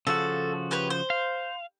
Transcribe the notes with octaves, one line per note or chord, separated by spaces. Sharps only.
C#3 F3 F#4 A4
G4 B4 C#5
C5
F5